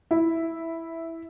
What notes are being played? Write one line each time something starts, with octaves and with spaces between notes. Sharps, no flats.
E4